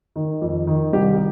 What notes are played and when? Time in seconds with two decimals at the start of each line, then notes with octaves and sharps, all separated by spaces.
0.16 D#3
0.42 F2
0.67 D#3
0.93 C2 G4